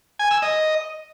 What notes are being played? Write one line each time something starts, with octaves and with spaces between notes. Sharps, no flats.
G#5
E6
D#5